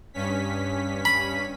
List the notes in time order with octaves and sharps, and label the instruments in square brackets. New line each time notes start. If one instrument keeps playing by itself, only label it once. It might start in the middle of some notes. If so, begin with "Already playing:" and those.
[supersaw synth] G2 C#4 B6
[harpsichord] B5